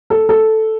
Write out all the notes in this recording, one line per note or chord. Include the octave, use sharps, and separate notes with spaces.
A4
A4